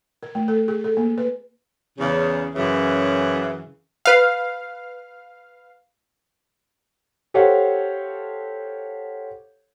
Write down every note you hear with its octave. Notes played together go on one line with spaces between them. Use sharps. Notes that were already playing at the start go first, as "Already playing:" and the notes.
A#4
A3
A4
G#4
A4
A#3
B4
E2 C#3
F#2 C#3 E3
B4 F5
G4 A4 C5 C#5 F5 F#5